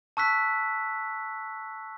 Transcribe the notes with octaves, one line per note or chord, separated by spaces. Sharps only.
A5 C#6 E6 F#6 B6